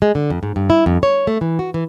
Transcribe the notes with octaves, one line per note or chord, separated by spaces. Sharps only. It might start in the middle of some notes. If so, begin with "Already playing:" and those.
G#3
D3
F2
G#2
G2
E4
F2
C#5
A3
E3
F#4
E3